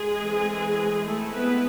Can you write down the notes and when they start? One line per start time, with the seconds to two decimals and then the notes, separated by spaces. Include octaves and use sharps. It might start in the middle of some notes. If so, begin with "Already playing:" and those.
Already playing: G#3 G#4
0.20 E3 A3 C4
1.04 G#3 A3 C4 E4 A4
1.32 B3 B4